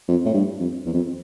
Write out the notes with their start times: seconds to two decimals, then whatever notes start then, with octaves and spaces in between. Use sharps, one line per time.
0.08 F2
0.26 A2
0.34 G2
0.60 F2
0.86 E2
0.94 F2